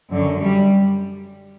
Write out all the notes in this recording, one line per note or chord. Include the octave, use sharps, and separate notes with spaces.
F#2 D3
G3